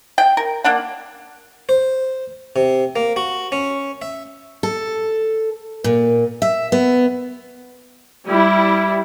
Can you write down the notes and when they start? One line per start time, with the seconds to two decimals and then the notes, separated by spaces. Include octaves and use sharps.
0.18 G5
0.37 A#4
0.64 A#3 D4 F#5
1.69 C5
2.56 C3
2.96 A#3
3.16 F#4
3.52 C#4
4.02 E5
4.63 A4
5.84 A#2
6.42 E5
6.72 B3
8.26 G3 E4